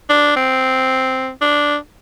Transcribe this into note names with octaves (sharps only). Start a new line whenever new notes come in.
D4
C4
D4